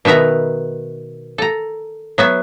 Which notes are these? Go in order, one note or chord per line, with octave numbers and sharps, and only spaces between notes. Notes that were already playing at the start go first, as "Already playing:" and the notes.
B2 D#3 B3 E5 A#5
A4 A#5
F#3 B3 E5